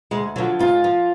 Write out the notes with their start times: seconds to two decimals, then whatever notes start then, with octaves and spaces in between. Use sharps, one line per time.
0.11 D2 G#3
0.36 D3 F3 F#3
0.59 G#2 F4
0.84 F3